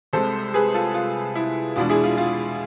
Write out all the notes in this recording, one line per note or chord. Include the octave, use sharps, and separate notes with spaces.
C2 C3 G#3 A4 C5
G#4 B4
F4 A4
F4
E4
E2 B2 G#3 D4 F4
E4 G#4
F4
F4